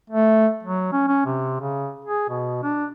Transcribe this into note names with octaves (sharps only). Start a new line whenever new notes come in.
A3
F#3
C#4
C#4
C3
C#3
G#4
B2
D4